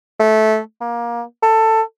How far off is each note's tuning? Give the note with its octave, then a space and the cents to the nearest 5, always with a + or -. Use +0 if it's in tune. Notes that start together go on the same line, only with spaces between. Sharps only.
A3 -15
A#3 +25
A4 +15